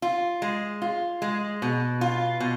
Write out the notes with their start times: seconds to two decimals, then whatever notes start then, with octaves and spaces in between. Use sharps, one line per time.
0.02 F4
0.42 G#3
0.82 F4
1.22 G#3
1.62 B2
2.01 F4
2.40 B2